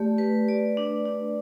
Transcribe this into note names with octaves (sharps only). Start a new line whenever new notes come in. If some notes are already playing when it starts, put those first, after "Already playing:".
Already playing: A3 G4 D5
B4
D5
D4
D4